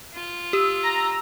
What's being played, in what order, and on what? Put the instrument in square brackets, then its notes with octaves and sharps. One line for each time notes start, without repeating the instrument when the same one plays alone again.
[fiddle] F4
[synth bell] G4 [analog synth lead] E6
[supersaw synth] A#5